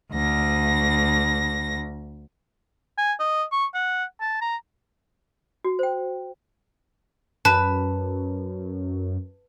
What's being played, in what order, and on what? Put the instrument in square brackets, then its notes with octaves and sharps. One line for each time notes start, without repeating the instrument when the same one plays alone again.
[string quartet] D2 A#6
[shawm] G#5
D#5
C#6
F#5
A5
A#5
[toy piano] F#4
C5 G5
[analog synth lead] F#2 [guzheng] B4 [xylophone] A5